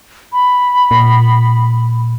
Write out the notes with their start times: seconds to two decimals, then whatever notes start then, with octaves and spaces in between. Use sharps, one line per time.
0.33 B5
0.91 A#2